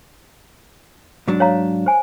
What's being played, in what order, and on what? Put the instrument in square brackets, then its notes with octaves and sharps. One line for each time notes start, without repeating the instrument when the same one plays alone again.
[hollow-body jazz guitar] G#2 F#3 D4
[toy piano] C#5 F5 A#5
C5 G#5